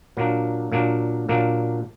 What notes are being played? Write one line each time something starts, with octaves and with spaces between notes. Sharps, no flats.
A#2 F#3 A#3 D4
A#2 F#3 A#3 D4
A#2 F#3 A#3 D4